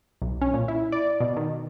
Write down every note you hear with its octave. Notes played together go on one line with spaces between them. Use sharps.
B1
C#4
A#2
E4
D5
B2
D#3